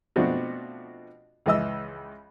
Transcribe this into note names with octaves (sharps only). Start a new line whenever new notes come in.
B2 F3 A3 C4 D4 F#4
C#2 E3 D#5 E6